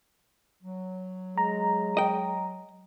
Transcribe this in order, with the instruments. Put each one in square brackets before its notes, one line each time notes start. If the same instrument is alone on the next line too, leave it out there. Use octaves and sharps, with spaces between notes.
[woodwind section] F#3
[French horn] G#3 [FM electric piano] A#5
[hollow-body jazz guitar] D#5 G5